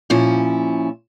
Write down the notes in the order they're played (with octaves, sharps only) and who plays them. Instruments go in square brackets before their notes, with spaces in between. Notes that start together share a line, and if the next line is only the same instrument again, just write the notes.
[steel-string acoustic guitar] A#2 F3 C#4 E4